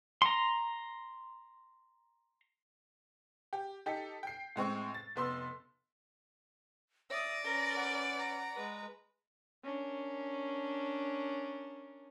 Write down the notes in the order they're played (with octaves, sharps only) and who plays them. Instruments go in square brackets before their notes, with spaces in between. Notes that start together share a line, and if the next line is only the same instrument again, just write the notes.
[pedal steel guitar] A#5 C6
[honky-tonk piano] G4
D#4 G4 A4 B6
G5 C7
A2 G#3 C4 C#6
A6
F1 B3 C6 E6
[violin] D5 [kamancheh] E5 D#6 [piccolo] A#6
[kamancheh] C#4 B4 [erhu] A#4 [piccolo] A#6
[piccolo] F#5
[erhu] A#5
[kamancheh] G#3 B4
[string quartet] C#4 D4 A#4